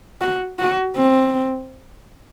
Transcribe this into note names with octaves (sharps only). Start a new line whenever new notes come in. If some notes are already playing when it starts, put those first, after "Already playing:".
F#4
F#4
C4